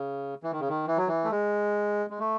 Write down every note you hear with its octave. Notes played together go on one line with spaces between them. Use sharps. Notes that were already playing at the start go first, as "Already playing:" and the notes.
Already playing: C#3
E3
D#3
C#3
D#3
E3
F#3
E3
A3
G#3
G#3
A3